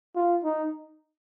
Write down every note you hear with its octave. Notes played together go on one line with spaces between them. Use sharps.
F4
D#4